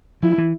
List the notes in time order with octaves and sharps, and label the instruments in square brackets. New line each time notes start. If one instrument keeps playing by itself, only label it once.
[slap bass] F3 [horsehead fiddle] E4
[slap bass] E3